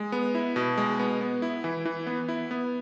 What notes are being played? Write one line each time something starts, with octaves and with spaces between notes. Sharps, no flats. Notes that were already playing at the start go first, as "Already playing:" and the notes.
Already playing: G#3
B3
E4
B2
G#3
B3
B3
E4
E3
E3
B3
E4
B3